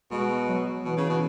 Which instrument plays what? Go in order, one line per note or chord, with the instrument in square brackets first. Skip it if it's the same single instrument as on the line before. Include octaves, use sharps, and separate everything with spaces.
[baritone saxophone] B2 [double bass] G#3
[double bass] F#3
[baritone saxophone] B2 [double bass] E3
[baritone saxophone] C#3
B2